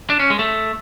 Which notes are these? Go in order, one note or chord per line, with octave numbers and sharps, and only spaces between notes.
D4
C#4
G#3
A3